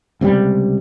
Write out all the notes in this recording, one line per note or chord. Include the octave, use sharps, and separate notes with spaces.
C#2 C3 D#3 G3